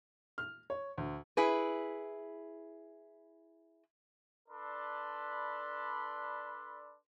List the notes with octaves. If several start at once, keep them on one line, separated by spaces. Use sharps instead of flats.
F6
C#5
D2
E4 G#4 B4
D4 A4 B4 D5 B5 C6